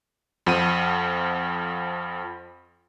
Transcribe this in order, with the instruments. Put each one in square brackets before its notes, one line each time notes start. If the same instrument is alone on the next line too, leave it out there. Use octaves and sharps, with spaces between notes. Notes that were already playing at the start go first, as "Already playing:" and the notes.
[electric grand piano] F2 F3 F#5 D#7